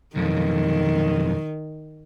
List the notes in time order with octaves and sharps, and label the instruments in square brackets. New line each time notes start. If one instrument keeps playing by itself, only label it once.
[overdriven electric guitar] B1 F2 [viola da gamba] D#3